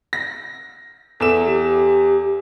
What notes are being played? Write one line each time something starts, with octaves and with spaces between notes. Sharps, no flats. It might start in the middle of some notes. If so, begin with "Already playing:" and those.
A#6
E2 A4 E5 E7
G4